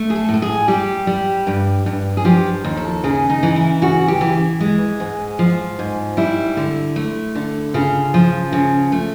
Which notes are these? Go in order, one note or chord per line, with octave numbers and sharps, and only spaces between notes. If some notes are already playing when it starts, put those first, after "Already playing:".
Already playing: A3
G#4
A4
A2 A4
G#4
G3 G4
G3
G2
G2
G#4
F3 G4
D#2
A4
C#3 G#4
D#4
E3
E4
C#3 F#4
G4
E3
G#3
G#2
F3
G#2
G3 E4
D3
A3
D3
C#3 F4
F3
C#3
A3